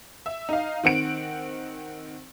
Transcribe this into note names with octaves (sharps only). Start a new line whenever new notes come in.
E5
D#4 F5
D#3 C4 F#5 D7